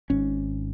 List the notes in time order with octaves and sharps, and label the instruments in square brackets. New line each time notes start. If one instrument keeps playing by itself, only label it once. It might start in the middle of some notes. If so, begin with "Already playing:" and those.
[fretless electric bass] G#1 G#2 C#4